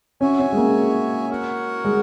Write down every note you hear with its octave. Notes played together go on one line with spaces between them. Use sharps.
C#4 F#4 C#5 E5 G#5
C#4
G#3
A#3
F#4 A#4 C#5 F#5
G#3